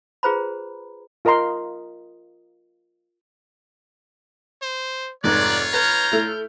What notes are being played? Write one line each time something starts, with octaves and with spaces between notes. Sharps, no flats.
F4 G#4 B4 C5 A#5 B5
F4 A#4 D#5 A#5 C6
C5
F1 G#2 F4 C#5 D5 F#6
B4 A#5 F6 G6
A3 E4